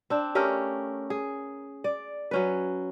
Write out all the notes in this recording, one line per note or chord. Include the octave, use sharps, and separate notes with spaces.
C4 D4
A3 C#4 G4 A#4
G#4
D5
F#3 C#4 B4